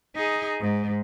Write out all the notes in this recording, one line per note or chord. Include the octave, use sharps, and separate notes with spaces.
D#4 G#4
G#2